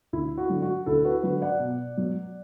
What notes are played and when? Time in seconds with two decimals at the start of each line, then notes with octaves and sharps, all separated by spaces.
0.13 D2 E4
0.38 F#4
0.49 D3 F#3
0.62 F#4
0.86 D2 E4 A4
1.05 F#4 B4
1.23 D3 F#3 F#4 B4
1.41 D5 F#5
1.60 B2
1.97 F#3 B3